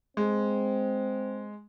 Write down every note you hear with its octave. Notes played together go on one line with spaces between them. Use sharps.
G#3 C4